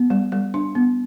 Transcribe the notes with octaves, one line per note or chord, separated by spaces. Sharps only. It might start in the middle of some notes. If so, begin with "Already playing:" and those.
Already playing: B3
G3
G3
D4
B3